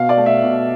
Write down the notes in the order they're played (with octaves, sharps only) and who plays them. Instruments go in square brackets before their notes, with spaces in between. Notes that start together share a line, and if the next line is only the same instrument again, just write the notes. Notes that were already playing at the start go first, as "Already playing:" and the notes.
Already playing: [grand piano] B2 F5
D5
A3
E5
B2